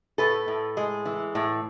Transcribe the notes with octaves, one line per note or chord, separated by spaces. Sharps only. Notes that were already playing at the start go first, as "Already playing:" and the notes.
A2 A4 B4
A2
G#3
E3
A2